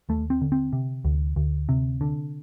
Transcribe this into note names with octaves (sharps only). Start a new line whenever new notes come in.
D#2 A3
C4
D3
C4
C3
D2
D2
C3
D3